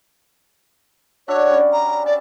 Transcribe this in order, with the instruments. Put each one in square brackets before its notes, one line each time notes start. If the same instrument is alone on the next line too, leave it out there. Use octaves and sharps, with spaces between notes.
[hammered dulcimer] D4 F#4 E5 [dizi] C#5
[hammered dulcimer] G3 C#4
[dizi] A#5
[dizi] D5 [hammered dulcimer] A5